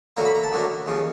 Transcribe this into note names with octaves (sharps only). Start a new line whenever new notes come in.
D2 D3 F#3 A#3 A#5
B5
A#5
A5
D2 D3 F#3 A#3
D#2 C#3 F3